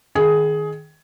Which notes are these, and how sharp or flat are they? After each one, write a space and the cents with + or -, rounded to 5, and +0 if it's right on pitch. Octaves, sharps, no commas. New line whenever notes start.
D#3 +0 G#4 +15